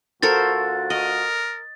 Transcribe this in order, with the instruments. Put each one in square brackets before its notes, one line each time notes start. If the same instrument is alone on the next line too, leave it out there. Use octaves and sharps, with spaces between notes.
[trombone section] D2 F4 F#4 [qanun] A4 A#4 C5 [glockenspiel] A6
[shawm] A#4 [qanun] D#5